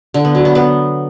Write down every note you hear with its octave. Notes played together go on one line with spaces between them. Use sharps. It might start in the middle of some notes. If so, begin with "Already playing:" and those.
D3
B3
F#3
B3
B3